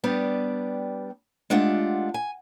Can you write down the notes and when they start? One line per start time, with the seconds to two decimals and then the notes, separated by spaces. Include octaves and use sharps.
0.04 G3 B3 D4 G4
1.50 G#3 A3 D4 F4 G4 F#5
2.14 G#5